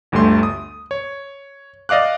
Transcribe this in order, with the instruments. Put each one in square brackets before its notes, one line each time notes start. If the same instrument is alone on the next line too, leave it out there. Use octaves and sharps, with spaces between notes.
[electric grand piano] G1 D2 G3 A3 C6
D#6
C#5
D5 D#5 F5 D6 F#6